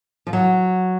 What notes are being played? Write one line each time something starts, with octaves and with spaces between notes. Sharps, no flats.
F3
F#3